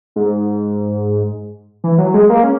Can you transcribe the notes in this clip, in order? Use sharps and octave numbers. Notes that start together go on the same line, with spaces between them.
G#2
E3
F#3
G#3
A#3
C#4